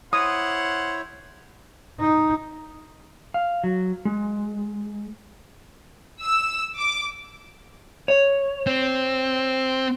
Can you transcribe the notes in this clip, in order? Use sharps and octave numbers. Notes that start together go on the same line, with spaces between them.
E4 C5 C#5 F#5 D#6
D#4
F5
F#3
G#3
E6
D6
C#5
C4